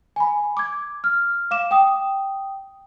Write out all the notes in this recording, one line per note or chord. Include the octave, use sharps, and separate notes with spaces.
G#5 B5
D6 G#6
F6
F5 D6 E7
G5 D#6